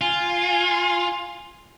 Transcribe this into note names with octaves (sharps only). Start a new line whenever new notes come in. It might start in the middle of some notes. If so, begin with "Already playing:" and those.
F4 G#5